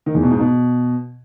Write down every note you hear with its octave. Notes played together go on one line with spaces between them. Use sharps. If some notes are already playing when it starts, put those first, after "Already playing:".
D#3
E2
B2
G#2
B2